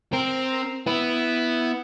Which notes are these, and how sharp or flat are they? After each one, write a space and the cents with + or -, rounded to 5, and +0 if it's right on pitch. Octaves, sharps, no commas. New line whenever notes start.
C4 +0 A#4 +0
B3 +0 E4 +0